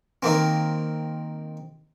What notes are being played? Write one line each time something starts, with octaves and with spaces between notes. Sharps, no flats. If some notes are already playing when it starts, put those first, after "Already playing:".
D#3 A#3 C4